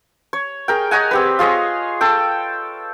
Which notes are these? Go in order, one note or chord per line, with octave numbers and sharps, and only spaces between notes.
C#5
G#4 A#4 G5
C#5 D#5 F#5 G#5
C4 G4 B4
F4 G#4 C#5 D#5
A4 G5